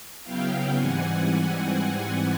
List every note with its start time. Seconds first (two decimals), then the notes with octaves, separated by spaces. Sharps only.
0.23 C#3 F#3 B3 E4 F5 G5
0.75 G#2 E3 G3 C4 F#5 G#5